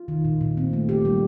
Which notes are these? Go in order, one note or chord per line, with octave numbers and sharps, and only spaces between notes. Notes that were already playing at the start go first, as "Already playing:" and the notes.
Already playing: F4
D#3
A#2
A#2
C4
A3
A#3 G4
G3